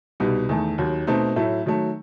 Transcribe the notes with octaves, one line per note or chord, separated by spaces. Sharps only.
C2 B2 G3 D#4
E2 D#3 A3
D#2 D#3 F#3
B2 A3 C4 D#4
A2 F#3 A3 E4
D#3 F#3 A3